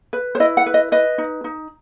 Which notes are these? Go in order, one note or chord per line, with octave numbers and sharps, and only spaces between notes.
B4
C5
E4 D#5
F#5
B4
D#5
B4 D#5
D#4
D#4